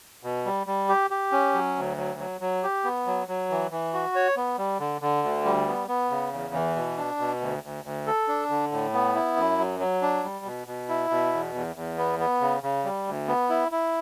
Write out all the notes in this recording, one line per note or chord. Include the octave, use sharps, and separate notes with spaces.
B2
G3
G3
G4
G4
C#4
F#3
D2
F#3
F#3
F#3
G4
B3
F#3
F#3
E3
E3
F#4
C#5
B3
G3
D3
D3
D2
G3
B3
B3
C#3
E2
E3
B2
D4
B2
D2
D2
D2
A4
D4
D3
A2
B3
E4
F#2
F#3
F#3
D4
G3
B2
B2
E4
B2
E2
E2
E2
B3
B3
C#3
C#3
G3
D2
B3
E4
E4